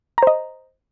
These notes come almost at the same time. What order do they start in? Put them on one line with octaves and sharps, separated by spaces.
A#5 C5 D#5